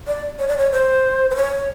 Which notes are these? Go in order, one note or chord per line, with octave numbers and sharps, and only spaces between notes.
D5
C#5
D5
C#5
C5
C5
C#5